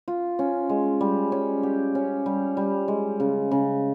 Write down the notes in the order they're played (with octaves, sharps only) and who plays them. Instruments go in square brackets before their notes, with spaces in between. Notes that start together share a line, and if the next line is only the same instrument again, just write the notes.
[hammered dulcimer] F4
C#4
G#3
G3
C#4
G4
C#4
G3
G3
G#3
C#3
C#3